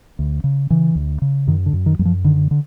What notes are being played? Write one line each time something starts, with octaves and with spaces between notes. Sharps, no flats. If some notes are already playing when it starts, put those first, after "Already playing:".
D2
C#3
C#3 E3
D2
C#3
F#2 D#3
D3
F#2
D#3
F#2 F#3
F3
D3 D#3
D3